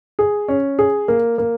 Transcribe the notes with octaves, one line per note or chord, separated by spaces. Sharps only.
G#4
C#4
G#4
A#3
A#3